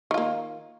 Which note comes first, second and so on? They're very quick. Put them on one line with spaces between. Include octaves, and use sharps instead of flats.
D#3 F4 A#3